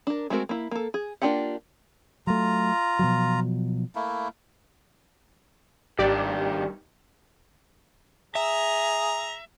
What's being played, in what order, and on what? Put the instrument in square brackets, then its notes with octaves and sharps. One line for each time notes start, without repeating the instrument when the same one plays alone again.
[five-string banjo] D4 A#4
G#3 A3 C4 F#4 A#4
A#3 E4
A#3 A4
G#4
A#3 D4 F4 G4 F#5
[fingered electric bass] F#3 A3 [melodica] F4 A#5
[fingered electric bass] B2 F3 F#3
[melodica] A3 A#3 E4
[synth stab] G#1 G4 D5 [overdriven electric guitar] G2 D#3
[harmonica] G#4 A#5 [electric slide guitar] E5